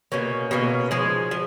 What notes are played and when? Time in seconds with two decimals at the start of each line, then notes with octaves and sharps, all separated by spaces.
0.12 B2 A#3 C#4
0.51 B2 A#3 C#4
0.91 F3 G#3 D#4
1.31 F3